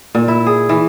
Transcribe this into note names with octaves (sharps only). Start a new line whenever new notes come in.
A#2
E4
G#4
E3